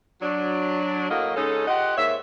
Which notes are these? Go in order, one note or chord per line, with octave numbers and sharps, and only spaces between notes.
F#3 D4
A2 F#3 A#3 F#4 D#5 F5
C#3 G#3 C#4 D#4 A4
F4 G4 D#5 F#5
G#2 A#3 C#5 E5